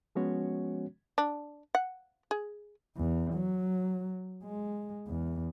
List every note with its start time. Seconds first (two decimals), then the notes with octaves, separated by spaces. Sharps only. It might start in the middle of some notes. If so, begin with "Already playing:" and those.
0.15 F3 G#3 B3 C#4 F#4 C#5
1.18 D4
1.75 F#5
2.31 G#4
2.97 E2
3.33 F#3
4.44 G#3
5.07 E2